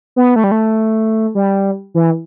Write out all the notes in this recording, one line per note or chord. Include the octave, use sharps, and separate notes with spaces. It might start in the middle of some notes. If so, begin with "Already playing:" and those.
B3
A3
G3
A3
G3
E3